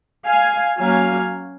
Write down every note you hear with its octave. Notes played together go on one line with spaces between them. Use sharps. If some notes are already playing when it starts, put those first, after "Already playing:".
F5 G#5
F#3 A#3 C#4 F5 G#5